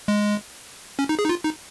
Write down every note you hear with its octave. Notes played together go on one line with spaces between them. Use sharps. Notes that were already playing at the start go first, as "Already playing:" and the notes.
G#3
C#4
D#4
G#4
D#4
F4
D#4